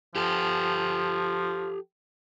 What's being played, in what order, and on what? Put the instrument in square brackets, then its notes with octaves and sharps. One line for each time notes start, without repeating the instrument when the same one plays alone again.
[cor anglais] F3 [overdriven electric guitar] G4 A4